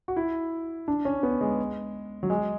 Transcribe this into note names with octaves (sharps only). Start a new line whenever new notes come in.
F#4
E4
D4
C#4
B3
G#3
F#3
G#3